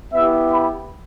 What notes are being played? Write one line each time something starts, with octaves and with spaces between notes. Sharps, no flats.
B3 E4 G4 E5
B5